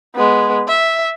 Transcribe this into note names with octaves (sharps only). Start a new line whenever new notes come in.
G#3 B3
E5